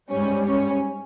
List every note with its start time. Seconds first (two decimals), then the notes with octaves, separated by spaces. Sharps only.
0.10 G#2 G3 C#4
0.46 C#4